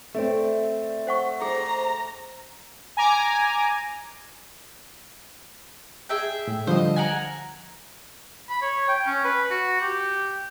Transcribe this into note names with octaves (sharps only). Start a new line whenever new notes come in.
A3 C4 D5 E5
C5 F#5 C#6
G#4 C5 A#5
G#5 A#5 D6
G#4 E5 G5
A2
D3 F3 G3 C5 D#5
A#4 F#5 G#5
B5
C#5
G5
C#4
B4
F#4
G4